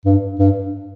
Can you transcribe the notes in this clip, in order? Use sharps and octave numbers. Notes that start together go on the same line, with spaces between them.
G2
G2